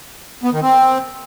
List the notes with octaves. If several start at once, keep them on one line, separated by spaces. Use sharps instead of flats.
B3
D#3
C4